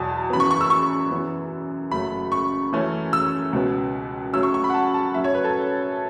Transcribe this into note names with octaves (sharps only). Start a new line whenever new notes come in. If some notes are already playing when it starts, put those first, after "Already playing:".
Already playing: E2 B2 F#3 A5
F#2 E3 B3 B5
C#6
C#6
E6
C#6
F#2 E3 B3
F#1 F#2 F#3 A3 B5
C#6
F#2 E3 A3 C#4
E6
C#2 B2 B3
F#2 F#3 A3 C#4 E6
C#6
C#6
B5
F#5
A5
A5
F#2 F#3 C#4 E5
C#5
B4
A4